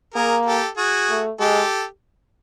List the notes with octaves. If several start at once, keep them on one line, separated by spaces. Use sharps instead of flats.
A#3 G#4 A#4
G4 A4
F#4 G#4
A3
G#3 G4 A4